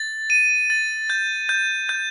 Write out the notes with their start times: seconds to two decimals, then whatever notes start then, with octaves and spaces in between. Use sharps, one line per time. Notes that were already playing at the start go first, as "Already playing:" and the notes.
Already playing: A6
0.30 D#7
0.70 A6
1.10 G6
1.49 G6
1.89 G6